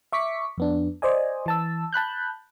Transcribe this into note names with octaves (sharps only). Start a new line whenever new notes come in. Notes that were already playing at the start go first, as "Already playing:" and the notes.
E5 C#6 D6 B6 C#7
F2 B3 D4
C5 D5 D#5 G#5
E3 A5 E6
A5 B5 F#6 G6